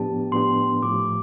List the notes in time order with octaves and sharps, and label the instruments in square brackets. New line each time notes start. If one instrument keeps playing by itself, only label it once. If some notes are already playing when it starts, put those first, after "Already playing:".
Already playing: [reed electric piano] A2 F3 B3 D4 G4 [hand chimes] A5
[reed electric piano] A2 F3 B3 D4 G4 [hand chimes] C6
[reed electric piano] A2 F3 A3 [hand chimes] D6